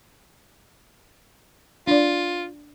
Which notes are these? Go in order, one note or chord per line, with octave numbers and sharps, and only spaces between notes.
D4 F4 D5